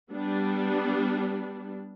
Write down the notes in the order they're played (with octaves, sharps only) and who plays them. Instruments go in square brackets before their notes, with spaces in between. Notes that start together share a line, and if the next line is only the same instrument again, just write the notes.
[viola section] G3 B3 D4